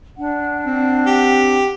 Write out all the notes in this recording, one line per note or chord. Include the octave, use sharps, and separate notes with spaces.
D4 F#5
C4
G4